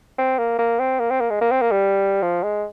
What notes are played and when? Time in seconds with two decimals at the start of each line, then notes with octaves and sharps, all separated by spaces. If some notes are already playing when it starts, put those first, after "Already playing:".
0.18 C4
0.38 A#3
0.59 A#3
0.80 C4
1.00 A#3
1.10 C4
1.20 A#3
1.30 G#3
1.41 A#3
1.51 C4
1.61 A#3
1.72 G3
2.22 F3
2.43 G#3